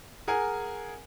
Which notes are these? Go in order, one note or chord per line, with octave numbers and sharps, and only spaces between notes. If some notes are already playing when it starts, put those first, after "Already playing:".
G#4 A#4 F#5 G#5